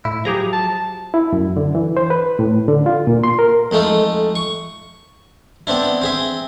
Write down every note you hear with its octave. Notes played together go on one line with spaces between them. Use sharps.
A2 E4
F3 F#3 G4 G#4 A#5
A5
E4
F#2
D3
E3
C5
B4
A2
D3
F4
A#2
C6
A#4
F2 G#3 A3 D#4
C#6
B3 C4 D4 E4
C4 G#4 E5